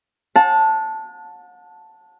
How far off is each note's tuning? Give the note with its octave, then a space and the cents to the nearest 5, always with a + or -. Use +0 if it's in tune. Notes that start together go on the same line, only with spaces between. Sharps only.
F#5 -40 A5 +0